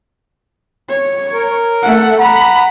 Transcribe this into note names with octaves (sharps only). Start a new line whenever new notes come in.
C#5
A#4
A3 F#5
F#5 A#5 B5